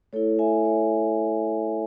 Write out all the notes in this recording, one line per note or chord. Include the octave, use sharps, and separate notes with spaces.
A3 E4 A4 C#5
E5 G#5
C#5 E5